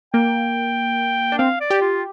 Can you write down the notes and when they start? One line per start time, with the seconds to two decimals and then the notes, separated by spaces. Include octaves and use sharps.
0.14 A#3 G5
1.32 D4
1.39 C4 F5
1.61 D5
1.70 G4
1.81 F4